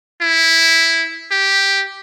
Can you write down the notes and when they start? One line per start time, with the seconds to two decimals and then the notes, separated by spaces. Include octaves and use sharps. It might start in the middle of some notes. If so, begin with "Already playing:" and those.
0.22 E4
1.31 G4